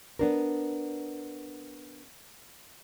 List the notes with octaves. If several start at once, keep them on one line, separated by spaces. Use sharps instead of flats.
B3 D4 A#4